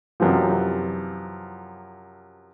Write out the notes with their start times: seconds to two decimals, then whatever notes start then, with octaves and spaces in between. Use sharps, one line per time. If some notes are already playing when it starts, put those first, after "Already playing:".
0.20 F#2 C3 E3 F3